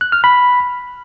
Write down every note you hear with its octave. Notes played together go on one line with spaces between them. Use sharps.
F#6
F6
B5